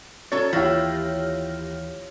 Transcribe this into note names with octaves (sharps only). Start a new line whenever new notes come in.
F#2 A4 C#5 A6
D#2 E3 E4 F4 G4 C#5 F6 A#6